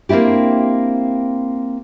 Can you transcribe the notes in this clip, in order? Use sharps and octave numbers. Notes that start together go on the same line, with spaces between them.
A#3 C4 D4 E4 G4